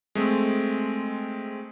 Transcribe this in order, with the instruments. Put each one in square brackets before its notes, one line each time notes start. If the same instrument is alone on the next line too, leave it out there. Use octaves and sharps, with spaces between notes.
[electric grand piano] G#3 A3 C4